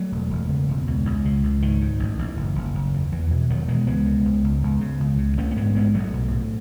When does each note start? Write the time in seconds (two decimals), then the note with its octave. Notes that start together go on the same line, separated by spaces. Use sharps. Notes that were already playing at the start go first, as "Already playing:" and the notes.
Already playing: F#3 A3
0.12 E1
0.30 E1
0.49 C#3
0.68 E1
0.87 C#2
1.05 C#2
1.25 C#3
1.44 C#2
1.62 G#2 D#3
1.81 G#2
1.99 A1
2.19 A1
2.37 F#1
2.55 F#1
2.75 F#1
2.93 E2
3.12 E2 E3
3.31 B2 E3
3.50 E1 D#3 F#3
3.68 B2 E3 G#3
3.87 C#2 G#3 B3
4.06 C#3
4.25 C#2
4.44 C#2
4.63 C#2
4.81 C#3
5.00 C#2
5.18 C#3
5.38 A1 A3 C#4
5.51 C#4
5.56 G#2 G#3 B3
5.75 A1 G#3 B3
5.94 A1 F#3 A3
6.13 B1
6.31 A2